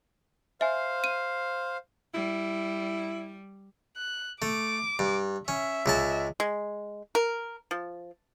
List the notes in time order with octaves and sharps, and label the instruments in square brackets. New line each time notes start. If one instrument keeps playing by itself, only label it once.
[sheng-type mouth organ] C5 F5 [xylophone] E5 G#5
[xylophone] D#7
[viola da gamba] G3 [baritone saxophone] E4
[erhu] F#6
[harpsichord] A3 [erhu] D6
[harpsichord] G2
[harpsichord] C#4 [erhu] E5
[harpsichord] C#2 G#3 A5
[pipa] G#3
A#4
F3